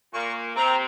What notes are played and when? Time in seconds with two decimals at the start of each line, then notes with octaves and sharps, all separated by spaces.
0.13 A#2 A#3 C#6
0.56 C3 C4 A#5